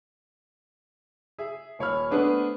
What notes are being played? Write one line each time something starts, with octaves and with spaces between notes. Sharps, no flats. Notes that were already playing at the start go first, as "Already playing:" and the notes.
G#4 E5
D#1 C#5 B5 F6
A3 B3 C4 D4 G#4 B4